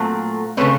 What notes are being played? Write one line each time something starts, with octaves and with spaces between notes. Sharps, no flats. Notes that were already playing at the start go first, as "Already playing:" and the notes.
Already playing: A#2 F#3 A3 C4
C#3 E3 A3 C4 B4 C#5